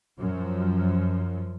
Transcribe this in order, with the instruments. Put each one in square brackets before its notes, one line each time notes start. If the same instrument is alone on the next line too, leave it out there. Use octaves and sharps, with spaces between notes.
[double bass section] F#2 F3